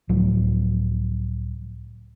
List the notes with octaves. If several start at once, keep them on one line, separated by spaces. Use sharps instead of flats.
C#2 A2 F3 F#3